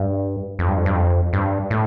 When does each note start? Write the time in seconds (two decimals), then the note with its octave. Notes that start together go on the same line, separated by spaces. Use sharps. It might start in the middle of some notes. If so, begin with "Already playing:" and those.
Already playing: G2
0.59 F2
0.68 G2
0.77 F2
0.86 G2
0.95 F2
1.33 G2
1.71 A2